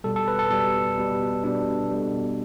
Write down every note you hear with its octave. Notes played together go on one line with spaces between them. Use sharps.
B2 G3 A4
A4
B4
A4
B2 G3 A4
B2 G3
B2 G3 D4
B2 G3